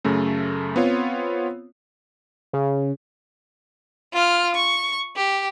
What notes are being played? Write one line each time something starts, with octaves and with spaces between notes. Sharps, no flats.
F#2 C#3 A3
B3 C4 F4 C#5
C#3
F4 F6
C#6
G4